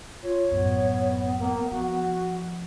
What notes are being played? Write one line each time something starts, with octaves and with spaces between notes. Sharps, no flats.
F4 C#5
A1 F#2 B3
A#3
F3 F#4